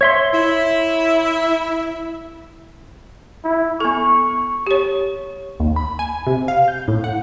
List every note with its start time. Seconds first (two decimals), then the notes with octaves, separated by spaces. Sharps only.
0.01 C#5 E5 C6
0.33 E4
3.44 E4
3.80 B3 A4 C#6
4.67 G4 C#5
5.60 D#2
5.76 B5
5.99 G#5
6.27 C3
6.48 F5
6.68 G6
6.88 A2
7.04 F#5